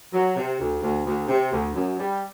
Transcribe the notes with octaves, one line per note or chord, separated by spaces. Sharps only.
F#3
C3
D2
D2
D2
C3
D2
F#2
G3